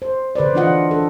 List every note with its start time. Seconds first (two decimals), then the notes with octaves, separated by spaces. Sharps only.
0.02 C5
0.35 D3 B4 C5 D5
0.54 E3 D4 F4 D#5 F#5
0.91 D4 A4